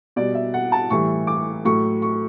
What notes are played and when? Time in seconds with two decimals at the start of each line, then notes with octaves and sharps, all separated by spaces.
0.16 B2 G3 D5
0.35 E5
0.54 F#5
0.72 A5
0.90 A2 E3 G3 C#6
1.27 D6
1.65 A2 F#3 C#6
2.02 C#6